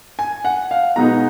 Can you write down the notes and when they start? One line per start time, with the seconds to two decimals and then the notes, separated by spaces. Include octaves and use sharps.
0.19 G#5
0.45 F#5
0.71 F5
0.96 B2 G#3 B3 D#4 A#5